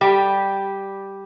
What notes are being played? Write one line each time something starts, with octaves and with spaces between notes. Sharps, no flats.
G3 G4